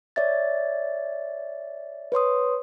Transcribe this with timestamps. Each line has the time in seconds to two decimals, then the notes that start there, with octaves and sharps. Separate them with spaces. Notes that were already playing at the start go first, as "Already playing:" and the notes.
0.16 C#5 D5 E5 A6
2.12 B4 C#5 C6 D#6